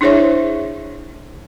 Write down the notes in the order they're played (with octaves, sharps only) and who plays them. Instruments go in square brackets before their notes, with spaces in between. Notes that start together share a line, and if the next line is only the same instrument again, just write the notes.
[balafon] D4 E4 G#4 C5 C#5 E5